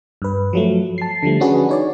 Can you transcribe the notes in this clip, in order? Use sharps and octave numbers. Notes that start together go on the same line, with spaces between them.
G2 B4
F3 F#3 A3
A5 C7
D3 F3 G3 A3
C#4 D4 F#4 G#4 B4
D#4 C#5 D5